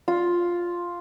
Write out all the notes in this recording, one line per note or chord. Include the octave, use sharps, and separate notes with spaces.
F4